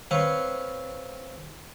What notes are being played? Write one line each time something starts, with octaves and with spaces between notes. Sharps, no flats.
C4 B4 C#5 F5